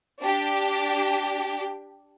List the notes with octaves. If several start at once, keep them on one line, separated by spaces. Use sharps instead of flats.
D4 G4